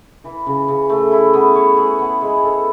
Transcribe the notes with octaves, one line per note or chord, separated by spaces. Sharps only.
E3
C#3
C#3
A3
E4
B3
C#5
G#4
B3
G#3
A4